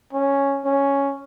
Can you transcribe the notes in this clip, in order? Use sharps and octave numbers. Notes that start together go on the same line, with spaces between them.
C#4
C#4